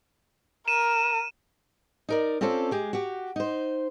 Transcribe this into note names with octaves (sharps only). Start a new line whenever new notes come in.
A#4 D#7 E7
D#4 A#4 D5
C4 C#4 F4 A4 C5 D5
G#3 G4 G#4
F#4 G4
D#4 C5